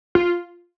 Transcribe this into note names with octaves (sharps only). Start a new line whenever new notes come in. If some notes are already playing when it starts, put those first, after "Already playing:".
F4